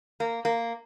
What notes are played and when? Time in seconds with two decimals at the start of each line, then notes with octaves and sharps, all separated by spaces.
0.20 A#3
0.45 A#3